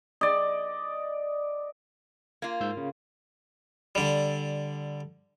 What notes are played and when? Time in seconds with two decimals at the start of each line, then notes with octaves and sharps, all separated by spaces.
0.21 D5 D#5
2.42 A#3 F4 G#6
2.61 G#2 E6 G6
2.77 C#3
3.95 D3 G3